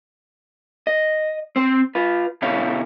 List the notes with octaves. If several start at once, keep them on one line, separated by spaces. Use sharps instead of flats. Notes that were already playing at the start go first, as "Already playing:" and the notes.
D#5
C4 C5
F4 B4
B2 D3 E4 C#5 F5